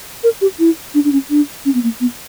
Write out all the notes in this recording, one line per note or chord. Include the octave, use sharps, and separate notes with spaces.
A#4
G4
E4
D4
D4
C#4
D4
C#4
B3
A#3
B3